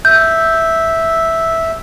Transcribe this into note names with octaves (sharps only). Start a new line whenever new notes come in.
E5 G6